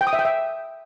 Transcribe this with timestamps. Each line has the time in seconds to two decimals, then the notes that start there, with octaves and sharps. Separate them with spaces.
0.01 G5
0.07 D#6
0.13 E5
0.19 G5
0.25 E5